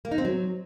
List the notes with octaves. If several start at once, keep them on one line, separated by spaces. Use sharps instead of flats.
A#3
D#4
C4
F#3